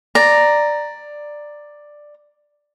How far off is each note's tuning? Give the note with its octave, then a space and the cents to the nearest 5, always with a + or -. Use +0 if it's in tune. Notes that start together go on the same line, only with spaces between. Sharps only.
D5 +10 A#5 +0